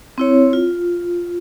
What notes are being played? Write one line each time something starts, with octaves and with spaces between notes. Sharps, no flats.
C4 E4 C#5
F4